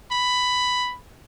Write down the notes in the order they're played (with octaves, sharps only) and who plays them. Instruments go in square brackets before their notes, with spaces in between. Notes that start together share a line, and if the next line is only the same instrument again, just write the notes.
[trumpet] B5